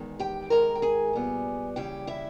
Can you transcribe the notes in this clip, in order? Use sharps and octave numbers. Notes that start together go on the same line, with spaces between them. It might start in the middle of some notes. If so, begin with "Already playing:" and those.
Already playing: E2 D#3 G#3
G4 G5
G#2 D#3 G#3 A#4 A#5
G5
G#4 G#5
A#2 G3 B3
D#2 C#3 E3 G3 G4 G5
E4 E5